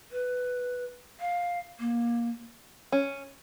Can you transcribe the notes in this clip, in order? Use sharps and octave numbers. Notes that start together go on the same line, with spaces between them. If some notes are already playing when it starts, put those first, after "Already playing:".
B4
F5
A#3
C#4